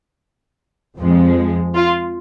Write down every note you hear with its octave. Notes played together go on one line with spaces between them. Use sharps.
F2 F3 G#3
F4